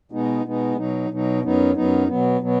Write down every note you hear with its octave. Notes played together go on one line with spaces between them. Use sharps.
B2 G#3 B3 D#4
B2 G#3 B3 D#4
B2 F#3 D#4
B2 F#3 D#4
F#2 F#3 B3 D#4
F#2 F#3 B3 D#4
B2 F#3 B3
B2 F#3 B3